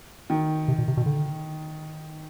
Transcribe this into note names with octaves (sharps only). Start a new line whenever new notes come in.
D#3
C3
B2
C3
B2
D3